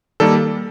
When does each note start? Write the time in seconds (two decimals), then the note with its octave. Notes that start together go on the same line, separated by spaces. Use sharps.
0.20 D#3 G3 A#3 A4